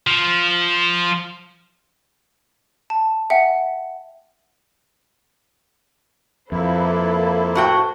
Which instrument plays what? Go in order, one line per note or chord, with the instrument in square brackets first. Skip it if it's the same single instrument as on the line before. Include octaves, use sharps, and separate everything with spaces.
[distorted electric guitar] F3
[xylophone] A5
E5 F#5 G5 C#7
[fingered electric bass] F2 [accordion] A#3 E4 [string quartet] A4 B4 C5
[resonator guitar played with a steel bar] A2 F#4 G5